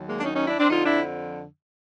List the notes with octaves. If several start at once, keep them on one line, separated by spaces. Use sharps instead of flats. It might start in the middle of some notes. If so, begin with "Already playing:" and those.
Already playing: D#2 D#3 F#3
G#3 A#3
D4
C#4 D#4
C#4 D#4
D4 E4
C4 D4
F2 D3 F3 D#4 F4
D4 E4